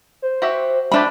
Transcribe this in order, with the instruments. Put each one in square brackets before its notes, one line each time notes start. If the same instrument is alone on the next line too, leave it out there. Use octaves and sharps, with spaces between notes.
[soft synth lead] C5
[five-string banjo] F#4 G4 E5
[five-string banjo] F3 A3 G4 [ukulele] D4 B5 [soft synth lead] E5